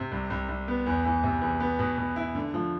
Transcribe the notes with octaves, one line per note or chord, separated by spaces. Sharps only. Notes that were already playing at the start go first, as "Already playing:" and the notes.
Already playing: C3
C2
C2
C2
B3
E2
E3
C3
E2
B3
B2
B2
E4
D3
F3